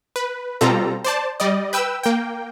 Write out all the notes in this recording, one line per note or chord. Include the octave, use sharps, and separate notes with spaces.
B4
B2 G3 C4 F4 A4 A#5
C5 D5 A5
G3 D5 D#5
B4 G5 E6
A#3 G5